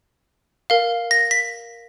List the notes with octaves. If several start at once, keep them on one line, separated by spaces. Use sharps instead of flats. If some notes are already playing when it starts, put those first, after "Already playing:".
A#4 F5
A#6
B6